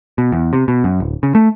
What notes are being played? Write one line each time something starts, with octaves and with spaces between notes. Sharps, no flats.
B2
E2
C3
B2
F#2
D1
C#3
A3